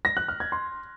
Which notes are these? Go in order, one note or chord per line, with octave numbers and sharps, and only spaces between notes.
A#6
F#6
F6
G#6
C6